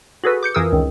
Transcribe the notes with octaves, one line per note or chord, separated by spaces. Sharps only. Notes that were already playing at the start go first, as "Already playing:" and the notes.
F#4 G#4 A4 B4
D6 G6 C#7
F2 E3 G#4 A#4 D#6 E6
C#2 D#3